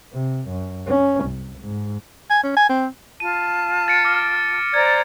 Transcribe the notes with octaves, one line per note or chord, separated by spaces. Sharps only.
C3
F#2
C#4
C2
G#2
G#5
C#4
G#5
C4
F4 A5 D#7
A6 C#7 D7
D6 F6 A#6
C5 D5 A#5 G#6